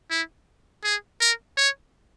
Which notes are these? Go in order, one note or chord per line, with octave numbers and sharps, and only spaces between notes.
E4
G#4
A#4
C#5